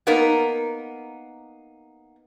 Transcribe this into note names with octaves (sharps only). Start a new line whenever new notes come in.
A#3 B3 D#4 A#4